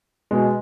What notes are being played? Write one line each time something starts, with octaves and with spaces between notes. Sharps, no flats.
B2 G#3